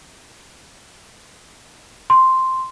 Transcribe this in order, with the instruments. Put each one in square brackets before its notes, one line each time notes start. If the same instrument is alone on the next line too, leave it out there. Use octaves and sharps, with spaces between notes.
[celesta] C6